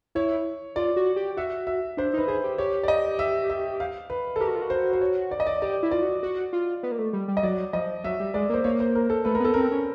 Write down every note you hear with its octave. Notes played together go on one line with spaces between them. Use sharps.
E4 C#5
F4 D5
F#4
G4
F#4 E5
E5
D4 C5
D#4 B4
G#4 C5
G4
G4 C#5
D5
D#5
E5
E5
F5
B4
A4
G4 A#4
F#4
F4
F#4
C5
C5
C#5
D5
D#5
D5
G4 D5
E4
F4 D5
F#4
F#4
F4
B3
A#3
A3
G3
G3
D#5
F#3 D5
F3 D#5
F#3 E5
G3
G#3 D5
A#3 C5
A#3 C#5
C5
A#4
A4
A3 B4
A#4
B3 A4
C4 A#4
C#4